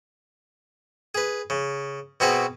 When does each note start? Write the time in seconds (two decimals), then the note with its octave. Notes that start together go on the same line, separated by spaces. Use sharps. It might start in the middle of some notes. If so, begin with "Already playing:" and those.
1.15 G#4 B4
1.50 C#3
2.20 B2 C4 F#4 G#4 B4